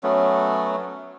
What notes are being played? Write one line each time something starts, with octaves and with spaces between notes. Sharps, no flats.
F#3 A3 B3 C#4